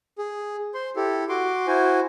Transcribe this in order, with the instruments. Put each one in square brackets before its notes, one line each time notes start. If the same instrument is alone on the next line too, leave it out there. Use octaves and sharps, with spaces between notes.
[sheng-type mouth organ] G#4
C5 C6
E4 G4 A4
F#4 C6 D6
E4 F#4 C5 G#5